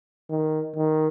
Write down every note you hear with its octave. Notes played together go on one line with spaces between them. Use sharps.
D#3
D#3